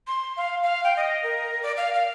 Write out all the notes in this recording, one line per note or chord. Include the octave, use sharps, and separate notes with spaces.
C6
F5
F5
G5
D#5
A#4
D5
F5
F5